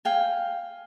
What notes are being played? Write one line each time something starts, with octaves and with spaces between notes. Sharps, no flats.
F5 G5 G#5